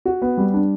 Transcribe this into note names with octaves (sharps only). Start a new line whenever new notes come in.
F#4
B3
G3
D4